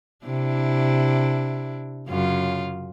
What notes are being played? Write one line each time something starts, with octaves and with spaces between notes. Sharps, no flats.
C3 D4 E4
F#2 C#3 F4